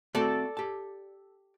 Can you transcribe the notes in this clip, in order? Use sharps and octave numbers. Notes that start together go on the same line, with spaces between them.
A3 C4 F#4 A4 D5
G4 A5